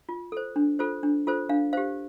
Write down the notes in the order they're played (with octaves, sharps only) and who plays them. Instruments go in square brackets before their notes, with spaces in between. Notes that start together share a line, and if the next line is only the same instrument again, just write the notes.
[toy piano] F4
A4 C5
D4
F4 A4 C5
D4
F4 A4 C5
D4 F5
G4 C5 F5